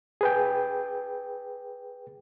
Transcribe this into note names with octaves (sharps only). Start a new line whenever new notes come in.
G#4 B4 G5